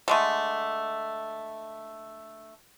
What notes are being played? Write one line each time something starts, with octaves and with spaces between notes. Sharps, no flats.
D3 G#3 A3